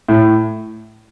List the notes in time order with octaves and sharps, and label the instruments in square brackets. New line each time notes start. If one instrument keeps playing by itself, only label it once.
[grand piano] A2